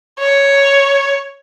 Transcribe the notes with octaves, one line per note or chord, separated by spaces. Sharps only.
C#5